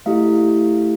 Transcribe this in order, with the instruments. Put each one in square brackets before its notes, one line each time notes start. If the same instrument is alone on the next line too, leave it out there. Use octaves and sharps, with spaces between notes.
[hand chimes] A3 E4 G4 F5